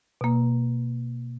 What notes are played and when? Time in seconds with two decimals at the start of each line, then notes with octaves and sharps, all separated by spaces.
0.21 B2 A#3